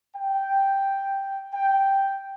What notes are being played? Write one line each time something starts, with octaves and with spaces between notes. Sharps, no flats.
G5
G5